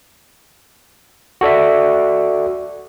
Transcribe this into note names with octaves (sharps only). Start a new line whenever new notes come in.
F#4 A4 D5 E5